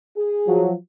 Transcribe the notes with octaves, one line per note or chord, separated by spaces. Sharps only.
G#4
F3 F#3